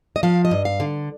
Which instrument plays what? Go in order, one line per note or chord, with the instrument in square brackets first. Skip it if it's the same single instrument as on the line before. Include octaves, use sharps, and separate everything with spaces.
[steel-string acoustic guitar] D#5
F3 F5
D#5
G2
F5
D3